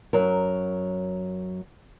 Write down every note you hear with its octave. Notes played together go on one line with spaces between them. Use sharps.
F#2 F#3 A#4